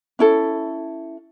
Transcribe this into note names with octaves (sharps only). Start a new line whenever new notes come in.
C#4 E4 A4